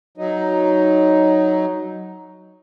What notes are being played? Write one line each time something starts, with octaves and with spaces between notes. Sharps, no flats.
F#3 D#4